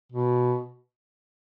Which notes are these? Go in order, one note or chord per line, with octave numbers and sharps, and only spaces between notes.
B2